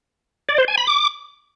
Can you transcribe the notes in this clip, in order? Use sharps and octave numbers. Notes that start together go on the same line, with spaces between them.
D5
C5
G#5
B5
D6